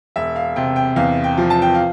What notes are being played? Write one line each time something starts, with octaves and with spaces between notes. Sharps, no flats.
E1 E5
F5
C3 G5
G5
E2 F5
G5
F3
A5
G5
F5